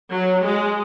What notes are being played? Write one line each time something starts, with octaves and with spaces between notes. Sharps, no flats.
F#3
G#3